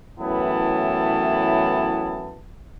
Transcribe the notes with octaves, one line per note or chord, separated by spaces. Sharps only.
F#2 A2 E3 B3 E4 A5